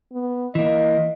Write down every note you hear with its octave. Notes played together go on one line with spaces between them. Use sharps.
B3
E3 A#3 D#5